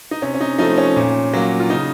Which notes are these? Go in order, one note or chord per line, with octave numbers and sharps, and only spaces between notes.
D#4
C3 C#4
C#4
D#4
F3 A3 D#4
C#4
A#2
F#3 A#3
F4
C#3 D#4